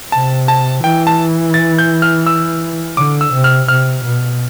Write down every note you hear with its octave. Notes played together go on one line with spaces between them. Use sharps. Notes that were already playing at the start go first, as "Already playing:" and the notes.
C3 A5
A5
E3 G5
A5
A6
G6
F6
E6
D3 D6
E6
C3
F6
C3 F6
B2